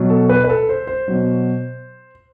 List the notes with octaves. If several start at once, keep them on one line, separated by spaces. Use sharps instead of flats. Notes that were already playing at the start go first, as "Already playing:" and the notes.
Already playing: B2 F#3
A4
B4
B4
A4
C5
C5
B2 F#3